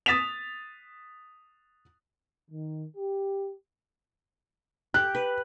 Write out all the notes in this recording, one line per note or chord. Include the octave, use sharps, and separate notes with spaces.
D#6 A6 B6 E7 F7
D#3
G4
G4 F#6
B4